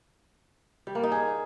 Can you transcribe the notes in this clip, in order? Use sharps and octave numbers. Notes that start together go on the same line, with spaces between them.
G3
A#3
D#4
G#4